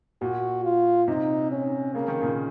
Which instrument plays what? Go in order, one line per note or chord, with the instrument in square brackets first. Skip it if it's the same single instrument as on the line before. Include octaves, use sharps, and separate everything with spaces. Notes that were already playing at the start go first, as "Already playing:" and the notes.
[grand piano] A#2 [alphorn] F#4
[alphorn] F4
[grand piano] C3 [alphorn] D#4
[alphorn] C#4
[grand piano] C#3 [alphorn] A#3
[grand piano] D#3
A#2 C#3